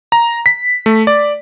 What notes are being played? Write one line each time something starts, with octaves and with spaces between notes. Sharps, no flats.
A#5
B6
A3
D5